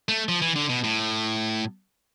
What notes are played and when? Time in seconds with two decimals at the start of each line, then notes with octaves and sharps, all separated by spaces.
0.09 A3
0.29 F3
0.42 E3
0.56 D3
0.69 B2
0.84 A2